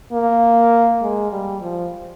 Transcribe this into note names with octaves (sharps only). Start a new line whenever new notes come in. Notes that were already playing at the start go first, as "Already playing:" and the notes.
A#3
G#3
G3
F3